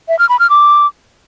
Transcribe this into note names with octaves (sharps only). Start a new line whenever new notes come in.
E5
F6
B5
F6
D6